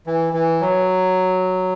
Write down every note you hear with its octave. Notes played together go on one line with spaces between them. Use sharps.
E3
E3
F#3